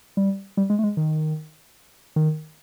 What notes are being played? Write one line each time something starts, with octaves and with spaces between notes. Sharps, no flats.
G3
G3
G#3
A3
G#3
D#3
D#3